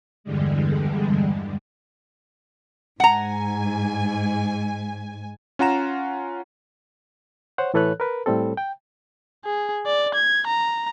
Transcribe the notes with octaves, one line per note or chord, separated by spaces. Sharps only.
E2 G2 D3 G3 G#3
G#2 F#5 G#5 A#5
C#4 F4 F#5 A#5 E7
C5 C#5 F#5
A2 E3 A4 B4 C#5 F#6
A#4 B4
A2 G3 C4 A4
G5
G#4
D5
G#6
A#5